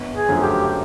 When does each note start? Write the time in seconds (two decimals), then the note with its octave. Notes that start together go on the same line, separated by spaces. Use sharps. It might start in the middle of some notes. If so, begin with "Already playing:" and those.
Already playing: G1
0.15 G#4
0.28 F#2 D3 F3 A3
0.42 G4